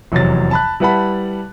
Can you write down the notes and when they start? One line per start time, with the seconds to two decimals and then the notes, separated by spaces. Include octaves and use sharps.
0.12 F1 E2 C3 F#3 A6
0.51 A5 B5 F#6
0.80 G3 E4 B4 F#5 A5 B5